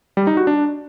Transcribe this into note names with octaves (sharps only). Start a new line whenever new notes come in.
G3
D#4
F#4
D4